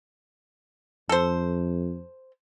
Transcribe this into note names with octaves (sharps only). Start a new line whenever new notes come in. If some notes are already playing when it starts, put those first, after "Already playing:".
F2 A4 C5